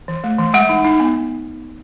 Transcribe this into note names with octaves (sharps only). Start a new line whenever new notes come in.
E3
A3
E3
G#3 F#5
D#4
D#4
B3